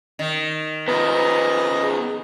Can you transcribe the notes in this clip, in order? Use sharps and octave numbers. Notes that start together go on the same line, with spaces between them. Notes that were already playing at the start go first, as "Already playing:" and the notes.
D#3
F3 B3 B4 D#5 A#5
G#4